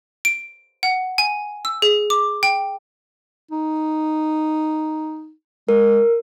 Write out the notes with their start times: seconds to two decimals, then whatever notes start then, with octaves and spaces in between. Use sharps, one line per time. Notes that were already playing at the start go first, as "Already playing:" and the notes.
0.25 D7
0.83 F#5
1.18 G#5
1.65 E6
1.82 G#4
2.10 D6
2.43 G5
3.51 D#4
5.69 G#3 A#4